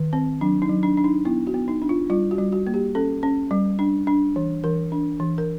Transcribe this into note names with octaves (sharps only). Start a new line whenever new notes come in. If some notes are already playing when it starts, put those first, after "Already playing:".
Already playing: D#3
C4
F#3 D4
D#4
F#3
D4
D4
D#4
B3 E4
F#4
B3
D#4
D4
F4
G3 F4
F#4
G3
F#4
A#3
G4
C#4 A4
C#4
G3
D4
D4
E3
E3 A#4
D4
E3
A#4